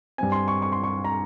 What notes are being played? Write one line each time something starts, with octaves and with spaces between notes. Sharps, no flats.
G2 G3 C4 G#5
C6
C#6
C#6
C6
C#6
A#5